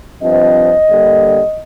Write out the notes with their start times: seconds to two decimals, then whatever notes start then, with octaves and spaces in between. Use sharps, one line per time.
0.22 G2 F3 C4 D#5
0.88 G2 D3 G3 A#3